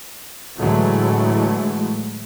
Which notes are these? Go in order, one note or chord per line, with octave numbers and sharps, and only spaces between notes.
A2 D3 E3 F#3 G#3 A3